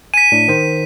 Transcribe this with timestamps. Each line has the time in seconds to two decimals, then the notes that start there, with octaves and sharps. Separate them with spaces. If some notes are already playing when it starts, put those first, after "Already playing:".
0.14 G#5 B6 D#7
0.32 A2 D4
0.48 D#3 C5